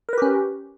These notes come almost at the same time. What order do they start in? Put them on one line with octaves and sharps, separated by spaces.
A#4 B4 G4 C#4